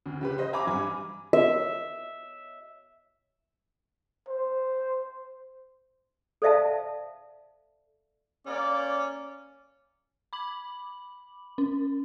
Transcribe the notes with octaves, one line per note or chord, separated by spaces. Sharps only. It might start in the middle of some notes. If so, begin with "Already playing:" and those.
D2
C#3 G4 B4
B4 C5 D#5
E5 G#5 A#5 B5 D6
G2 G#5
E5
C5
A4 C5 D5 E5 F5 A5
A#3 C#4 D5
B5 D6 F#7
C#4